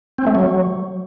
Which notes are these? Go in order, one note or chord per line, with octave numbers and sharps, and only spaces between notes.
C4
A3
F#3